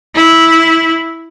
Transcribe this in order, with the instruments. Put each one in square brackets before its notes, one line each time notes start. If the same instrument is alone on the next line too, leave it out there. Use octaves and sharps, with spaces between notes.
[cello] E4